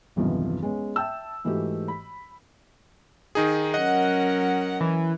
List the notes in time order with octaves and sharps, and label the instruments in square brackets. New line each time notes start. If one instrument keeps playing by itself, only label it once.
[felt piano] B1 E2 G2 C3 D#3 F3
G#3 B3 C#4
E5 G5 A5 E6
G#2 E3 A3 F#4 G4
B5
[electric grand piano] D#3 D#4 G#4
[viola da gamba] F#3 C#4 A#4 [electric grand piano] D#5 [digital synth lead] F#5
[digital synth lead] E3